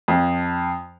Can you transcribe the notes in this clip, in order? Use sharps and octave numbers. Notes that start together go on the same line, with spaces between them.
F2